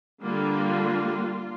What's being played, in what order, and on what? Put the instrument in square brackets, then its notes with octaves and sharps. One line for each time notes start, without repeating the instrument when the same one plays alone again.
[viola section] D3 G3 A#3 F4